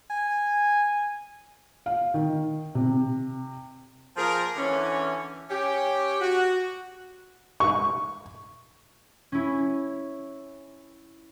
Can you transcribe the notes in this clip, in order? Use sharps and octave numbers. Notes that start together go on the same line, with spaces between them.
G#5
F5
D#3
C3
F3 A#3 G#4 A#4
D3 E3 C#4
C#4 G4
F#4
C#6
C#4 E4